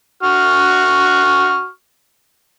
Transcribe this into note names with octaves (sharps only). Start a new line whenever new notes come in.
F#4 C#6 F6